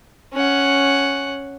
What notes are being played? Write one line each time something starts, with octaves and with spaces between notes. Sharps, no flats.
C#4 F#5